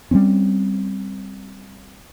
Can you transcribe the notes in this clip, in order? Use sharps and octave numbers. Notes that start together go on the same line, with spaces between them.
G3 G#3 C4 C#4